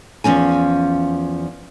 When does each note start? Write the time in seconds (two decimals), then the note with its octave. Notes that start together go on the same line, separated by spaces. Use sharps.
0.24 E2 F3 C#4 G#5